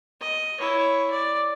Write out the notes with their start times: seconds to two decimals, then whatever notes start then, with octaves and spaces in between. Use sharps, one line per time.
0.21 D#5
0.60 E4 C#5
1.11 D5